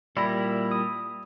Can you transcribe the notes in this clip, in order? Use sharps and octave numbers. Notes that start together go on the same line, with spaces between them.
A#2 G3 E4 D5 B5 A#6
D#6